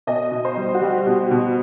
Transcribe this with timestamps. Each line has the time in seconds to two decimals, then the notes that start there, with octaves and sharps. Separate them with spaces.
0.07 B2 D#5
0.32 B2
0.45 C5
0.57 G3
0.74 F#4
0.81 G3 G4
1.06 B2
1.31 B2